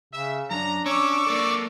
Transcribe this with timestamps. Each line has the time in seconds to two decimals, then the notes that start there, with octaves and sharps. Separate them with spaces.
0.13 C#3 E5
0.51 F#2 D4 A#5
0.86 C#4 C#5 C#6 D6 E6
1.27 A#3 A4 D5